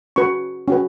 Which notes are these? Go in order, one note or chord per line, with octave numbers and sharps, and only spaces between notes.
C#4 F#4 B4 C#6
C#4 F#4 B4